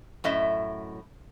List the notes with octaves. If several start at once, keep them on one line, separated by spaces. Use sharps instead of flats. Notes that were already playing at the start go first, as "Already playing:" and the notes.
F#2 A2 D#5 E5